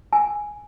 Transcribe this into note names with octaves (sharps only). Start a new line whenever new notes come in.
G#5